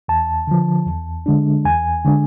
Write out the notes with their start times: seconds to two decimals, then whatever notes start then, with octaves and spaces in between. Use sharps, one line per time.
0.08 E2 A5
0.47 D3 F3
0.86 E2
1.26 D3 G#3 D4
1.65 E2 G#5
2.05 D3 G#3 D4